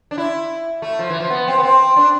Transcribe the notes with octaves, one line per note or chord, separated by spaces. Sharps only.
D4
E4
A3
F3
E3
F3
B3
C4
B3
C4
D4